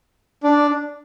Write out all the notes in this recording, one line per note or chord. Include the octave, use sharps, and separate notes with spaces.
D4